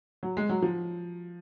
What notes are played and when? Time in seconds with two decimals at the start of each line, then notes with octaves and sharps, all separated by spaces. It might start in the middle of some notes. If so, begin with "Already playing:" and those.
0.23 F#3
0.37 G#3
0.49 F#3
0.62 F3